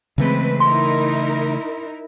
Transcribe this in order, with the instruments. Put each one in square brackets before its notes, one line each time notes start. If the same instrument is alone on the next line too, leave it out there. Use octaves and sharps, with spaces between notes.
[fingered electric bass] C#3 E3 A3 [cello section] G#3 C4 B4
[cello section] D#4 E4 A#4 [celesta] C6